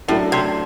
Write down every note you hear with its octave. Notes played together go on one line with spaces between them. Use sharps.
F#2 A2 F#3 A3 D4 A4
C3